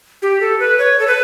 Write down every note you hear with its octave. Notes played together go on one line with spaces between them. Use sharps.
G4
A4
B4
C#5
A4
B4